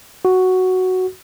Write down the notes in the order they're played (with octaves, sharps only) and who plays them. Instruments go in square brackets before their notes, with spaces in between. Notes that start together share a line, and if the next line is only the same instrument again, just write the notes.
[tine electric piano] F#4